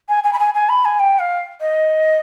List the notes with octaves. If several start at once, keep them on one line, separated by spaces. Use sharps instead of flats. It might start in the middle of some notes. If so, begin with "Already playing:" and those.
G#5
G#5
B5
G#5
G#5
B5
G#5
G5
F5
D#5